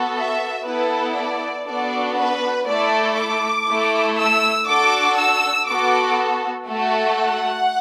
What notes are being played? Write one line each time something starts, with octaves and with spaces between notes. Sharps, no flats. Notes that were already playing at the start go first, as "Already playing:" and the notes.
Already playing: B3 F#4 A4
E5
B3 E4 A4 B4
D5
B3 D4 F#4 A4 D5
B4
A3 E4 A4 D5
D6
A3 E4 A4
E6
D4 F#4 A4 D6
E6
B3 F#4 A4 D6
A3 F#4 A4
F#5